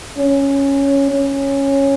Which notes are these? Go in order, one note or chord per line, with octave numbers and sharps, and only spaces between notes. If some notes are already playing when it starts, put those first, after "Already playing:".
C#4
C#4